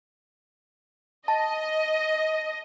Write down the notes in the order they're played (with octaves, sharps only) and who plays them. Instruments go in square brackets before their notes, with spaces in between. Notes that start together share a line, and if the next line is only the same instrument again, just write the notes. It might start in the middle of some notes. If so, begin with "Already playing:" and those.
[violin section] D#5 [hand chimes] A5